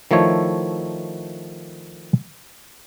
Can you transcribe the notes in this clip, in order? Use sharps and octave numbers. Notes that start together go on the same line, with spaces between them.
D#3 F3 A3 E4 C#5